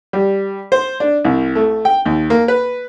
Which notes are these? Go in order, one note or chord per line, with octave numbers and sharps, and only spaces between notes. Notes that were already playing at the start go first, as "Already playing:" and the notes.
G3
C5
D4
C2
A3
G5
D#2
A#3
B4